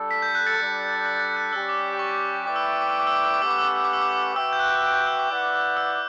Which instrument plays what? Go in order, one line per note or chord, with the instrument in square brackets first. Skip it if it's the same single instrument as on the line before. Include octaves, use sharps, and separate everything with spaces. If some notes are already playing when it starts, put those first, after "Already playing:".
Already playing: [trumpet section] G3 D4 A4
[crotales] B6
G6
F#6
A6 C#7
[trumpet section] G3 D4 A4
[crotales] A6
G6
F#6
[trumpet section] G3 C#4 G4 D5 [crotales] E6
[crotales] D6
D6
C#6
[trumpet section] A3 E4 B4 D5 G5 [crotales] D6
[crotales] E6
D6
E6
D6
E6
D6
E6
D6
E6
D6
[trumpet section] A3 C#4 G4 B4 F#5 [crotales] E6
[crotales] D6
E6
D6
E6
D6
E6
D6
[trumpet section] F#4 B4 E5 G5 [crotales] E6
[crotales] G6
F#6
F#6
G6
E6
D6
[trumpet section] E4 B4 D5 F#5
[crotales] E6